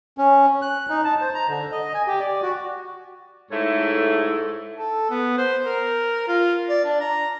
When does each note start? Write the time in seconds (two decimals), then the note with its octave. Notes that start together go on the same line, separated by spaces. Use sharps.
0.18 C#4
0.62 F#6
0.90 D#4
1.04 A5
1.21 C5
1.34 A#5
1.49 D3
1.72 D#5
1.94 G#5
2.07 G4
2.20 D5
2.43 F#4
3.51 G#2 A3 E4 A4 C#5
4.76 A4
5.10 B3
5.38 C5
5.65 A#4
6.28 F4
6.69 D5
6.85 D4
7.01 A#5